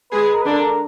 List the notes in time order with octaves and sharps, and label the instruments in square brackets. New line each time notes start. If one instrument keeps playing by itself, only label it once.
[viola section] G#3 G#4 [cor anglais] B4
[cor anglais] A#4
B4
[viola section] D3 D4 [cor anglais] A#4
[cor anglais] A#4